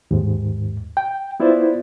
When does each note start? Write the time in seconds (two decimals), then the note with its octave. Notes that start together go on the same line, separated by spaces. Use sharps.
0.11 D#2 G#2
0.97 G5
1.40 B3 E4 F4 C5 D5